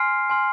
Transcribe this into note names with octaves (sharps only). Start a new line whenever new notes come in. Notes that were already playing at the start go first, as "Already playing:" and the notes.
Already playing: G#5 C6 F6 C7
G#5 C6 F6